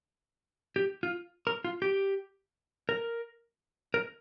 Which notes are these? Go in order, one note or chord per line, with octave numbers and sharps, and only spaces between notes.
G4
F4
A#4
F4
G4
A#4
A#4